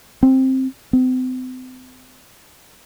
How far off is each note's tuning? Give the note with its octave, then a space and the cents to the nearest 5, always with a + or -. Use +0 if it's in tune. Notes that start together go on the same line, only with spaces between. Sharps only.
C4 +10
C4 -40